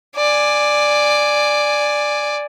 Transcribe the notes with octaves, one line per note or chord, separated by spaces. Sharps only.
D5 G#5